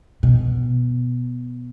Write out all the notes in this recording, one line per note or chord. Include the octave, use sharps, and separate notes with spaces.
B2